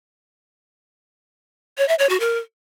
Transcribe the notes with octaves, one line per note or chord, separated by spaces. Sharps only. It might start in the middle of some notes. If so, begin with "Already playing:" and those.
C#5
E5
C#5
F#4
A#4